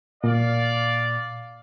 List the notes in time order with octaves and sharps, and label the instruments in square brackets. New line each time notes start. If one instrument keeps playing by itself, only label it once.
[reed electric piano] A#2 [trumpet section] D5 F5